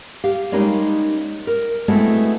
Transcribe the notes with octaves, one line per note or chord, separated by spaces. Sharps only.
G4 F5
G3 G#3 A#3 C#4 D#4 G4
A#4
G#3 A3 B3 C4 E4 F#4